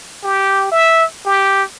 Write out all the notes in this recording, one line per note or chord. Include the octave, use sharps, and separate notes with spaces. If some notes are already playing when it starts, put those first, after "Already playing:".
G4
E5
G4